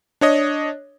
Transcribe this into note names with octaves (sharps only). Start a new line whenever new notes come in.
D4 C#5 D#5